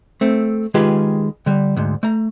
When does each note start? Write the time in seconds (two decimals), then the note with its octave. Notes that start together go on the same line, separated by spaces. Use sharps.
0.21 A3 C4
0.74 D#3 G#3 F4 G4 G#4 B4
1.46 D3 G3
1.76 D2 G#2
2.03 A3 A#5